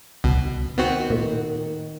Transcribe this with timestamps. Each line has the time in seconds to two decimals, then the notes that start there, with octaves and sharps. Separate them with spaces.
0.24 C#2 B2
0.78 D#3 B3 C4 F#4
1.10 A#2